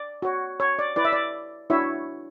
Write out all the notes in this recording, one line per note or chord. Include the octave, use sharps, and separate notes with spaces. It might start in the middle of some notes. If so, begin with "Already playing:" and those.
Already playing: D5
F#4 C#5
C#5
D5
E4 B4 D5
E5
D5
D4 E4 F#4 C#5 E5